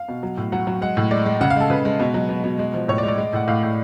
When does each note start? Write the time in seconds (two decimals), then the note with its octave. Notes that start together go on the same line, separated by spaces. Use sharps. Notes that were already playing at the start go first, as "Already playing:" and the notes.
Already playing: F5
0.08 B2
0.23 F#3
0.37 A2
0.52 F#3 F#5
0.67 F#3
0.81 G#3 F#5
0.97 A2
1.11 G#3 D5
1.26 G#3
1.41 C#3 F#5
1.50 F5
1.56 G#3 A4
1.70 C#3 B4
1.85 G#3
2.00 B2
2.14 F#3
2.29 B2
2.44 B2
2.59 G#3
2.74 F3
2.88 A2 C#5
2.98 D5
3.03 G#3
3.08 D5
3.18 G#3
3.33 A2 F#5
3.48 A2 F5
3.63 A2